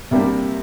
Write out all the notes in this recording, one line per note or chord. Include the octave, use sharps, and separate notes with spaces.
C3 G3 A#3 D4 G4